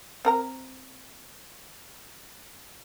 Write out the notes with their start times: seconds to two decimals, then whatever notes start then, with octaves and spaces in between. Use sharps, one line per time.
0.25 C4 A#4 A#5